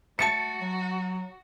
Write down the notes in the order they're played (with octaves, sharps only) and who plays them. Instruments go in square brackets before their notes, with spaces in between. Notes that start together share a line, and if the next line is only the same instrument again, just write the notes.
[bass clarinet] A3 [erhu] F#4 [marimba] E5 A5 [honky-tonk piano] A6 C#7
[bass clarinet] F#3